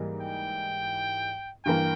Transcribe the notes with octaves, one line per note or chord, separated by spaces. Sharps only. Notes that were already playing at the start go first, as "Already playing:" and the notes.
Already playing: G#2 E3 G3 A#3
G5
G2 E3 A#3 G5